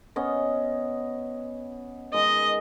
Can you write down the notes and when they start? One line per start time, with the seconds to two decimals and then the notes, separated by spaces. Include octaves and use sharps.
0.16 B3 C#4 D#5
2.14 D#3 G#3 D#5